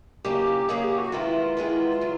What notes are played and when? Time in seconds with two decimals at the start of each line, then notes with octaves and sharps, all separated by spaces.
0.24 C#3 F#3 A#3 D#4 G4
0.47 G4
0.69 C#3 F#3 A#3 D#4 G#4
0.83 G4
0.98 F#4
1.12 C3 D#3 G#3 B3 E4 F4
1.57 C3 D#3 G#3 B3 E4
2.01 C#3 F#3